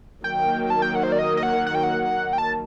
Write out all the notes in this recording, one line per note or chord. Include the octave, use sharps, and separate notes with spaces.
D#3 F#3 A#3 G5
A5
G5
F#5
C5
D5
D#5
D#5
F#5
F#5
G5
F#5
G5
A5